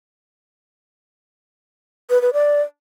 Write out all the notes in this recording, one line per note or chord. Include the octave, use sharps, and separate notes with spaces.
B4
B4
D5